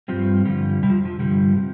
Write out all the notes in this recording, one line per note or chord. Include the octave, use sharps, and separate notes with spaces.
G2 F3 G3 C4
G2 D3 F3 G3
F2 C3 G3
F3
F3
G2 D3 F3 G3
C3 F3